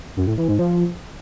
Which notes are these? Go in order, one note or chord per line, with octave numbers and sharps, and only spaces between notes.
F#2
A2
E3
G#2
F3